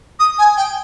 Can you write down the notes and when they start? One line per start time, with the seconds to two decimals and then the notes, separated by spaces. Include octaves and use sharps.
0.19 D#6
0.38 G#5
0.57 G5